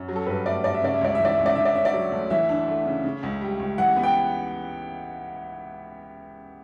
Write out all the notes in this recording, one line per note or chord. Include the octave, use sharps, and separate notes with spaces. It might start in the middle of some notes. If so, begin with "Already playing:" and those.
Already playing: F#2
F#3
A4
G2 B4
A3 D5
G2 D5
E5
C#3 D5
E5
C#2 D5
E3 E5
D5
C#2 E5
D5
D3 E5
D5
C#4 E5
D5
F#3
D2
E3 E5
D4
A3
C#3
C#3
C#2
G3
C#2
E3 F#5
B3
G5